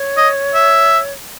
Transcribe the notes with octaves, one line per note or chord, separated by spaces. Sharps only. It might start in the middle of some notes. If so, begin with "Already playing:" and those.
Already playing: C#5
D#5
E5